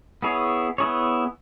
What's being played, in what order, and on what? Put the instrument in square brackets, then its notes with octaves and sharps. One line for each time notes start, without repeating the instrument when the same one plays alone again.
[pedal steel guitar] B3 E4 G#4 C#5
B3 E4 G#4 C#5